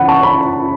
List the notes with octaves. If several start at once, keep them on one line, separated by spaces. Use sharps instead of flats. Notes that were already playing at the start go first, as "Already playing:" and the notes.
Already playing: C#3 E3 C#4 F#5 B5
A5 C#6
B5